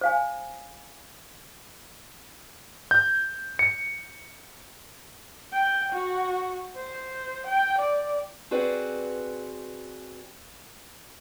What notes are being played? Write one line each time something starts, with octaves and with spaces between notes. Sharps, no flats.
C5 F5 G#5
G6
C#7
G5
F#4
C5
G5
D5
C4 F#4 G#4 B4 D5